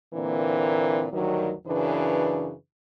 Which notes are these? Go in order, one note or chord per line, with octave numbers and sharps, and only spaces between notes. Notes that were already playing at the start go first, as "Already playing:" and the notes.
A#2 D3 E3 A#3 C4
D2 G2 D#3 F#3
F#2 C#3 E3 D4 B4